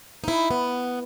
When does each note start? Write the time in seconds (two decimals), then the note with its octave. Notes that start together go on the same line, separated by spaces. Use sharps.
0.24 D#4 E4
0.51 B3